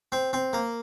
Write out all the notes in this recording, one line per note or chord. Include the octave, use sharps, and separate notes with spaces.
C4
C4
A#3